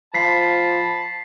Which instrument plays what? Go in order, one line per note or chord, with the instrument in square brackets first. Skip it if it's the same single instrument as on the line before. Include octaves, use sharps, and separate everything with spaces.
[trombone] F3 [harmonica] A5 B5 [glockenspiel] B6 C7